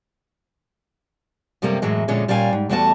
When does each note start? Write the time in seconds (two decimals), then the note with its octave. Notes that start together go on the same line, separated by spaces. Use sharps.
1.62 F#2 C3 G3 A3 A#3
1.82 F#2 A2 E3 F#3 G#3
2.08 F2 A#2 D3 G#3 C#4
2.28 A#2 G3 C#4 D5 F5 G#5
2.53 G#2
2.69 E2 G3 A3 F#4 D5 A5